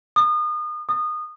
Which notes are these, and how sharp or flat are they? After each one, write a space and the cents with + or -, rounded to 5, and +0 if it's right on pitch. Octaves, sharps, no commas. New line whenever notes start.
D#6 -35
D#6 -25